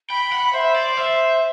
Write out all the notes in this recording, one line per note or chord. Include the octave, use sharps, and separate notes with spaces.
G5 B5
F#5
C5 E5
D5
C5 E5